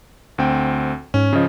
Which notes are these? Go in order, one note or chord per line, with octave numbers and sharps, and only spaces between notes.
D2 C4 G5
G#2 C#4
C#3 F3 C#4 D#5